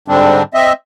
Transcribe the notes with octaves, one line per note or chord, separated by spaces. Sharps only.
G#2 D3 G3 C4 D4
C4 D#5 E5